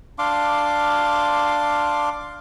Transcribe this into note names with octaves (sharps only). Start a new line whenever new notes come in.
D4 F5 C6 D6